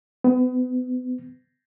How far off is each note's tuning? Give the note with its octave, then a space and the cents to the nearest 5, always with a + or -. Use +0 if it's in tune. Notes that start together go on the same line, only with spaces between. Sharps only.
B3 +35